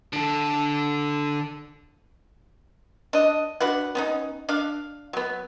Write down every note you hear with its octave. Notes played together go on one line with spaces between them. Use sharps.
D3 A4
D4 D#5
D4 F#4 B4 F#5
B3 C#4 D#4
D4 F5
F#3 B3